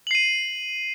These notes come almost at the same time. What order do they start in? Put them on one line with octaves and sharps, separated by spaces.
F#7 C7 D#7